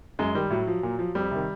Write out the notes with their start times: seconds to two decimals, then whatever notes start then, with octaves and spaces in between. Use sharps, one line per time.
0.19 F#2 G#3
0.34 D#3 G3
0.50 A2 F#3
0.67 F3
0.83 A#2
0.99 F3
1.15 F2 G3
1.31 C3 D#3